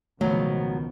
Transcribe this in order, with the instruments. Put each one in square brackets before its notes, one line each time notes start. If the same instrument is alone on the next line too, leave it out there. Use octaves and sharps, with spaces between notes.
[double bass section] C#2 B2 F3 [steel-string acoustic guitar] D#3 [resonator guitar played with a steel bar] F#3 B3 [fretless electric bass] A3